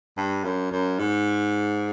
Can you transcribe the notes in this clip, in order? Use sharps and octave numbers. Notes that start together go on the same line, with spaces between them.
G2
F#2
F#2
G#2